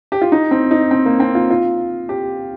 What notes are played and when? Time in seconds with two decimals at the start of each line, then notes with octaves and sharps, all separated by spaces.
0.12 G4
0.22 F4
0.32 D#4
0.51 C4
0.71 D#4
0.91 C4
1.06 A#3
1.20 C4
1.35 F4
1.50 F4
2.09 G4